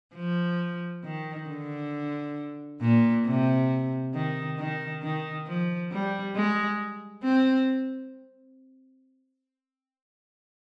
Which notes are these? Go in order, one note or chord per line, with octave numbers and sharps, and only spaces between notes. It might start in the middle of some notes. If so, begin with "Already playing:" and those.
F3
D#3
D3
A#2
C3
D#3
D#3
D#3
F3
G3
G#3
C4